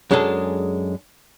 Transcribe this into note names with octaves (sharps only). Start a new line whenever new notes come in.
F#2 G#3 D4 G#4 A4